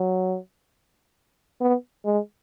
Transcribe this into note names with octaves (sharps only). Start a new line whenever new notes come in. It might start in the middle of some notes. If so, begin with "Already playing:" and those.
Already playing: F#3
B3
G#3